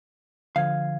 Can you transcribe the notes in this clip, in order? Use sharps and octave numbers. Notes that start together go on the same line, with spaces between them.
D3 F3 F5 G#6